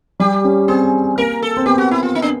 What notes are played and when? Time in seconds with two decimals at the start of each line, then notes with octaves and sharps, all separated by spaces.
0.20 G3 G4
0.45 C#4
0.68 C4 G#4
1.18 A#3 A#4
1.42 A4
1.57 C4
1.66 B3 G4
1.78 F#4
1.91 E4
2.03 F4
2.15 D#4
2.22 D4